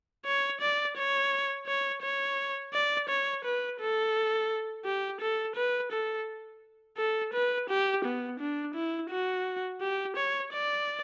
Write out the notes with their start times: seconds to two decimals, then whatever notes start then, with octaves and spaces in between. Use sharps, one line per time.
0.25 C#5
0.61 D5
0.97 C#5
1.67 C#5
2.02 C#5
2.73 D5
3.09 C#5
3.44 B4
3.79 A4
4.85 G4
5.21 A4
5.56 B4
5.92 A4
6.97 A4
7.33 B4
7.69 G4
8.05 B3
8.40 D4
8.74 E4
9.10 F#4
9.81 G4
10.16 C#5
10.52 D5